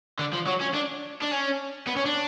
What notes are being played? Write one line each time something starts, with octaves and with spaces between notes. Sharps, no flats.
D3
F3
F#3
C#4
D4
D4
C#4
B3
C#4
D4